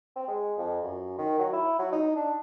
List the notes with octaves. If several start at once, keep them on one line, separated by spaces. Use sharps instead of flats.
C4
G#3
F2
F#2
D#3
F#3
E4
F#3
D#4
D4